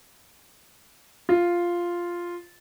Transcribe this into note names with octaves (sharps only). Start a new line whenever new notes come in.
F4